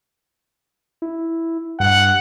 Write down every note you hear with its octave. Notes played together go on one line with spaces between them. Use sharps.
E4
G2 F#5